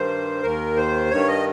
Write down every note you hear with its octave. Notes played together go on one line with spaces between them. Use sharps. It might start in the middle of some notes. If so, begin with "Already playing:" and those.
Already playing: G2 D#3 C5
D#2 D#3 A#4
C5
G2 D#3 C#5
D#5